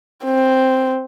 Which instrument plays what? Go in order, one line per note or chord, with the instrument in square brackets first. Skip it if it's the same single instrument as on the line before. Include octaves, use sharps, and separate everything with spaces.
[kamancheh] C4